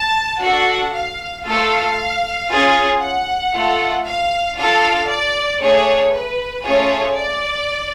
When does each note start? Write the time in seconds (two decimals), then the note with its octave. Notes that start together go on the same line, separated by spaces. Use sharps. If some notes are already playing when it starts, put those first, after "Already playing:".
Already playing: A5
0.41 D4 F#4 A4 F#5
0.93 F5
1.45 A3 F4 A4 F5
2.49 C#4 F4 G#4
3.01 F#5
3.53 A3 F4 A4
4.05 F5
4.57 D4 F4 A4 F5
5.09 D5
5.61 A3 D4 G#4 C#5
6.14 B4
6.65 A3 C#4 F4 G#4 C#5
7.17 D5